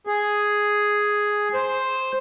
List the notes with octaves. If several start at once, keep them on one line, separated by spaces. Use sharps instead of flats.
G#4
C5